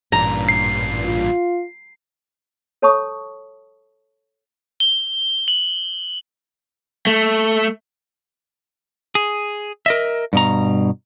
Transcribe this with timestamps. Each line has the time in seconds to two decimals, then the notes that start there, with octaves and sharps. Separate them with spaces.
0.12 A1 G2 A#2 A#5
0.49 C7
1.05 F4
2.82 A4 C#5 A5 B5 C#6 D#6
4.80 G7
5.48 F#7
7.07 A3
9.15 G#4
9.86 A#4 D#5 E5
10.33 G2 B2 A#5